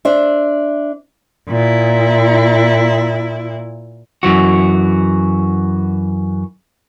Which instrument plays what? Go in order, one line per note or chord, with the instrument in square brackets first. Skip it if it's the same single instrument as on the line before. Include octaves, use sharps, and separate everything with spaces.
[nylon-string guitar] D4 C5 E5
[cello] A#2 E4
[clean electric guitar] F#2 E3 F#4